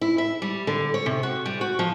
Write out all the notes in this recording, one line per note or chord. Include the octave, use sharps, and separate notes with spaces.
E4
E5
G3
D3
C#5
C3
F#4
G3
F#4
F3